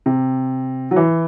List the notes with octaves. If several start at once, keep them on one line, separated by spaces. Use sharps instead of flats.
C3
F#3
E3